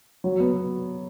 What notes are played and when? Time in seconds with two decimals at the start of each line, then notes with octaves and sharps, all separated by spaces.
0.24 F#3
0.40 B3